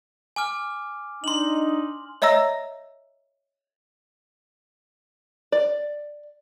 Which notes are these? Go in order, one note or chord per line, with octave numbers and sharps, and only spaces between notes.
G#5 D6 F6
D4 D#4 C6 F#7
C#5 D#5 E5 A#5 E6 A#6
D5